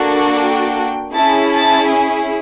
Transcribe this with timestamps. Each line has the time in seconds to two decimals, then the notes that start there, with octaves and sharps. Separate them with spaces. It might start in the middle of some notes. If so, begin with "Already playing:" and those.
Already playing: A#3 D4 F#4 A4
0.38 G5
1.13 C#4 E4 G#4 A5
1.50 A5
1.86 G#5